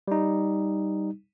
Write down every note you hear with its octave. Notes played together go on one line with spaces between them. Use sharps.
G3 D#4